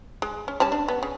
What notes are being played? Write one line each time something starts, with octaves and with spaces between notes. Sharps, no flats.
G#3
C#4
G3 C#4 A5
D4
B3
C#3